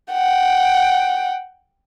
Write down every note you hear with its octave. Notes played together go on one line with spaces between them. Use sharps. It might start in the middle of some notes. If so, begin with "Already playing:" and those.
F#5 G5